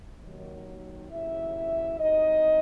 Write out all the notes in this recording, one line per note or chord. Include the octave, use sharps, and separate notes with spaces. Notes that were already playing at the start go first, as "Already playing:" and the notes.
D#2 D#3 F#3
D#2 C#3 F#3 E4 E5
C2 C3 F#3 D#4 D#5